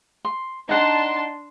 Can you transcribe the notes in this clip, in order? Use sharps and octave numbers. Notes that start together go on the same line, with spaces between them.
C6
D4 D#4 F#5 A5 A#5 C6